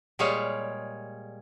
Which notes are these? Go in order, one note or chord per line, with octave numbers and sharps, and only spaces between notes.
A#2 G3 G#3 G#4 C#5 F5